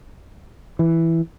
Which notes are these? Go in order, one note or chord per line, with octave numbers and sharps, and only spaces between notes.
E3